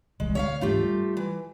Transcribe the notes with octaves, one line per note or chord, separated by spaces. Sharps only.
D#1 C2 E3 G#3
D2 C#5 E5 F5
G#2 E3 A3 D4 F4 G4
G3
E3